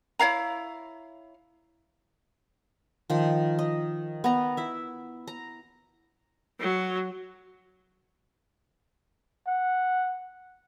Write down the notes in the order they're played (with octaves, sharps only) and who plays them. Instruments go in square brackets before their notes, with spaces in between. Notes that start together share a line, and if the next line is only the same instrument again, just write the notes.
[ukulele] E4 C#5 F5 A#5
[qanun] D#3 F3
D#5
B3 A#5
E4 E5
A#5
[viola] F#3
[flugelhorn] F#5